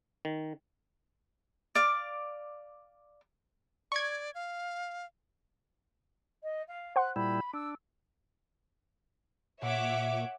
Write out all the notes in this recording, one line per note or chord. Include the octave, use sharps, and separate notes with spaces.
D#3
D5 F5 D6
D5 C#6 G#6
F5
D#5
F5
C5 F#5 C6 F#6
A#2 G3 E4 B5
D4 E6
A#2 C#5 E5 F#5 D6